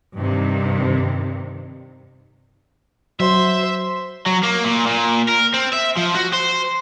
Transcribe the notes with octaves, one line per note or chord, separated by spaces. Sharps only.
G2 C3 D#3
F#3 C5 E5
F#3
A#3
A#2
A#2
A#4
C4
E5
F3
F#4
C5